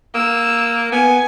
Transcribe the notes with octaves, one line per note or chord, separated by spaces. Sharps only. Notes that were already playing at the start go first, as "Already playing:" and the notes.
A#3 E6
B3 G#5